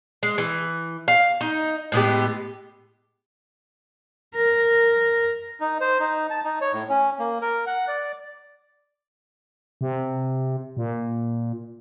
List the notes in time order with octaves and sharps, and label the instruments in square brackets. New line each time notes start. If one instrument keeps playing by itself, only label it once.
[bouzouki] G#3
E3
F5
D#4
A2 G#3 B3 G4
[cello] A#4
[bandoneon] D#4
C5
D#4
A5
D#4
C#5
A2
C#4
A#3
A#4
F#5
D5
[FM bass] C3
A#2